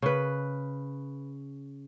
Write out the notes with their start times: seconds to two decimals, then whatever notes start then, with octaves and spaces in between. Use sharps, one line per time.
0.02 C#3 B4